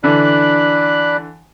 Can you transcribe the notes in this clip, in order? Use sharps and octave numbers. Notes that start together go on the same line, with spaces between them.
D3 E3 D4 B5 F#6